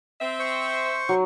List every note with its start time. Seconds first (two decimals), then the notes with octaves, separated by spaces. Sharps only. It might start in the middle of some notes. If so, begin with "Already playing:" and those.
0.21 C4 E5
0.40 C5 C#6
1.09 F#3